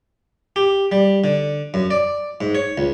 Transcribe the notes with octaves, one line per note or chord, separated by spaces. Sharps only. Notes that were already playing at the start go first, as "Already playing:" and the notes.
G4
G3
D3
F#2
D5
G#2
C#5
C#2